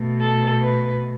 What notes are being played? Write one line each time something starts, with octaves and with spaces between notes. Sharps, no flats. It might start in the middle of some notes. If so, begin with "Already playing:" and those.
Already playing: B2 A3
A4
B4